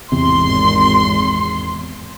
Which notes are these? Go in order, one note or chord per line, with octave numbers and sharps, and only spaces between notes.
G#1 E2 C3 C6